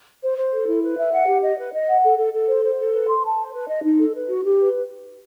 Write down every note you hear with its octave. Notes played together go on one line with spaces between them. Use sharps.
C5
C5
A4
E4
B4
E5
F#5
G4
D#5
B4
D#5
F#5
A4
A4
A4
C5
C5
A4
B4
C6
A5
C5
B4
D#5
D#4
A4
B4
F#4
G4
B4